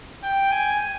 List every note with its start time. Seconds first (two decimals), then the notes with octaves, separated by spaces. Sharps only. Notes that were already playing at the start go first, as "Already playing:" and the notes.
0.23 G5
0.52 G#5